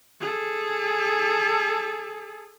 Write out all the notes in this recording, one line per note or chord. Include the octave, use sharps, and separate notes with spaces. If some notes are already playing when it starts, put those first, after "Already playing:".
G#4 A4